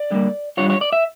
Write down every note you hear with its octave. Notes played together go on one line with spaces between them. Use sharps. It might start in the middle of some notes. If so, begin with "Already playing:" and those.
Already playing: D5
D3 G3 A#3
G2 D3 G3 D4 F4 C#5
C#5
D5
E5